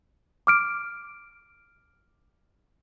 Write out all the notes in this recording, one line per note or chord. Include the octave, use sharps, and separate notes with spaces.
D6 F6 D7